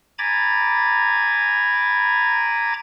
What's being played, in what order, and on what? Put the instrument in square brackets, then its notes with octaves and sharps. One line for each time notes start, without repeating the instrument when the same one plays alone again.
[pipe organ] G#5 A#5 B5 D6 G#6 A6